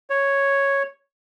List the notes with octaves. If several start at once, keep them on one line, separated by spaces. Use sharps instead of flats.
C#5